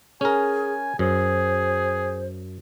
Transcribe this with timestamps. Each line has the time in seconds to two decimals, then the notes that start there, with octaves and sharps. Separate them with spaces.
0.21 C#4 G#4 A#4 G#5
0.99 F#2 G#4 C5